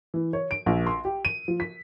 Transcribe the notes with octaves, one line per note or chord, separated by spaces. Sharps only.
E3
C#5
D7
A#1
C6
G4
D#7
F3
B6